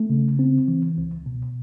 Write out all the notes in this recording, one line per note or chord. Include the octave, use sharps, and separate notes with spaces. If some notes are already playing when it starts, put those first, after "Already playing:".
Already playing: A3
C#3
C4
E3
C#2
B2